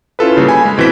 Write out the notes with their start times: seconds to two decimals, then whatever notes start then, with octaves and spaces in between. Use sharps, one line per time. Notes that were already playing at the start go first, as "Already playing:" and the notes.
0.19 C#4 E4 F4 A4 B4
0.37 C#3 G3 A#3
0.49 G#5 B5
0.65 G#3
0.78 B2 E3 C4 B6 E7